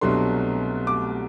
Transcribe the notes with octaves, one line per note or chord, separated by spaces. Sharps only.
C2 B2 F#3 A3 D4 C6
D6